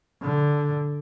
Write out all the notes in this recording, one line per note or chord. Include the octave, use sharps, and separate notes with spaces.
D3